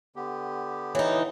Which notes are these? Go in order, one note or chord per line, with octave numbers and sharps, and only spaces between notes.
D3 B3 G4
E3 D#4 C#5